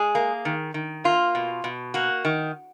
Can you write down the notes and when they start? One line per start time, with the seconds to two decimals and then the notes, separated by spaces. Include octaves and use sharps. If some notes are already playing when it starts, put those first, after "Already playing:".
Already playing: G#3 G#4
0.15 A#3
0.45 D#3
0.74 D#3
1.04 A#3 F4
1.35 B2
1.64 B2
1.94 A#3 F#4
2.25 D#3